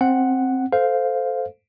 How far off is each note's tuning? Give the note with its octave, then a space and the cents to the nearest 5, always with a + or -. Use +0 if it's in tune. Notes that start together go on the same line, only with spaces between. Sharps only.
C4 +10 F#5 +0
A4 +0 C5 -15 F5 +5